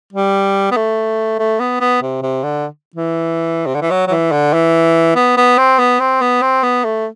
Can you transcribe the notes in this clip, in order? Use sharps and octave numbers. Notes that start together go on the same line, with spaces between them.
G3
B3
A3
A3
B3
B3
C3
C3
D3
E3
C3
D3
E3
F#3
F#3
E3
D3
E3
B3
B3
C4
B3
C4
B3
C4
B3
A3